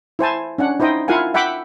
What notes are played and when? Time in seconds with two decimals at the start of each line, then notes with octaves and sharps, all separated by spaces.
0.19 E4 C5 G#5 A5
0.58 C#4 D4 F#5
0.80 D#4 E4 C5 D#5 G5
1.08 E4 F4 A#4 F5 F#5 G#5
1.34 E5 F#5 G5 B5 D6